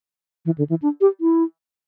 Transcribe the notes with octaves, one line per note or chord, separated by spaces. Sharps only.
E3
D3
E3
D4
G4
E4